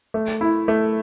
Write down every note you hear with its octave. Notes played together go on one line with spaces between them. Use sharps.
A3
E4
A3